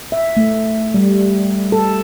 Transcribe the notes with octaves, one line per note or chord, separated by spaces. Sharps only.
E5
A3
G3
A4